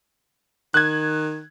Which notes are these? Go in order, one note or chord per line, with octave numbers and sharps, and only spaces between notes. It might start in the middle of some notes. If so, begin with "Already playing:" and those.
D#3 F#6 G#6